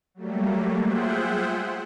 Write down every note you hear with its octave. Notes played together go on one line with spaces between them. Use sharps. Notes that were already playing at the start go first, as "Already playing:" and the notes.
F#3 G3 A3 A#3
F4 G#4 C5 E5 F#5 G5